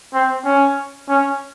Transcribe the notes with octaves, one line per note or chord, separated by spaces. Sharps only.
C4
C#4
C#4